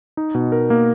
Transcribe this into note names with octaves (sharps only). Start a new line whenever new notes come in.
D#4
B2
A#4
A#3